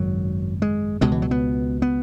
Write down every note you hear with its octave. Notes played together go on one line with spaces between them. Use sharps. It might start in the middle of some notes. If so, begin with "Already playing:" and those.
Already playing: G#1 F#2 C#3 F#3
G#3
C#2 B2 G#3
E3
F#3
B3
B3